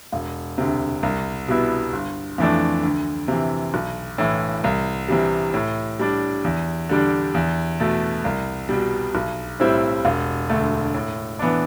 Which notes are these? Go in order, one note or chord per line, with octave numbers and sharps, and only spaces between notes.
E1
D2 C3
C2
B2 G3 B3 E4
G1
F2 E3 A3 D4
D2
C3 E3
B1
A2 E3
C2
C3 E3 G3
A2
G3 D4
E2
D3 G3 D4
E2
B2 A3
C2
B2 G3
B1
A2 G3 C4 E4
E1
D2 D3 A3
A2
E3 B3 D4